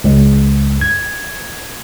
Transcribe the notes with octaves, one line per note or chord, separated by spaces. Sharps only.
C#2
G#6